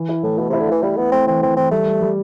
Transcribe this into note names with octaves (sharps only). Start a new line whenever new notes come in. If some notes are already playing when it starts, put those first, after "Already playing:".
Already playing: E3
E4
A2 A3
B2 E4
C3 E4
D3
E3 E4
G3 E4
B3 E4
A3 C4
E3 C4
E3 C4
E3 C4
G3 A3
G3
G3